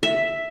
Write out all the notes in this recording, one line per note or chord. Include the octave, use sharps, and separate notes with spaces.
E5